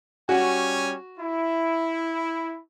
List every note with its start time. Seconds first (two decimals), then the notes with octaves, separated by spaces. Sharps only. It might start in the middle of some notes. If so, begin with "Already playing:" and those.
0.29 G3 C#4 F#4 G#5
1.20 E4